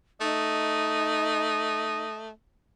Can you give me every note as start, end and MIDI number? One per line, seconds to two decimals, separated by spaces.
0.21 2.30 57
0.21 2.03 63
0.21 2.28 75